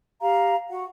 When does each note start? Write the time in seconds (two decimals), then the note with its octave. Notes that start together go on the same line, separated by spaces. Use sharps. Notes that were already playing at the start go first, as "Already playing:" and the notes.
0.21 G4 F5 A#5
0.68 F#4 F#5